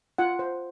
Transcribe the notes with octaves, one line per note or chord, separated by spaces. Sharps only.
F4 F#5
C5